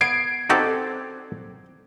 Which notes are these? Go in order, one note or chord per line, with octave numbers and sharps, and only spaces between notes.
B3 G#6 C7 D7
C4 D#4 F#4 G4 A4 D5